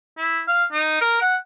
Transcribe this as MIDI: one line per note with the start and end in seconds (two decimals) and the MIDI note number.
0.18 0.41 64
0.48 0.65 77
0.72 0.99 63
1.01 1.19 70
1.21 1.36 78